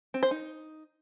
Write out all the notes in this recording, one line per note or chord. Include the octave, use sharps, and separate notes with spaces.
C4
C5
D#4